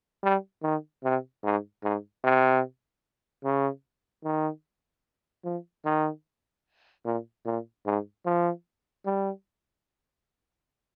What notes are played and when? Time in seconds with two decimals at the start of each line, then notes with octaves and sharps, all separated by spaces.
0.23 G3
0.63 D#3
1.04 C3
1.44 G#2
1.83 G#2
2.24 C3
3.44 C#3
4.24 D#3
5.44 F3
5.85 D#3
7.05 A#2
7.45 A#2
7.85 G#2
8.25 F3
9.06 G3